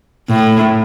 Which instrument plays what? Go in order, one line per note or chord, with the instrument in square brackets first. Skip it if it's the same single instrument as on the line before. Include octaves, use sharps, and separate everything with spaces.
[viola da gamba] A2